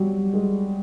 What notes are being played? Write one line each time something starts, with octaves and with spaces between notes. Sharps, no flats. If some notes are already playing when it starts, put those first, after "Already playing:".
Already playing: F#3 G3
G#3